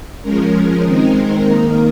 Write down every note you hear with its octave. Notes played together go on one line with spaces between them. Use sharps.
F3 G#3 C#4 A#4
D#3 G#3 C4 D#4
D#3 A#3 D#4 A#4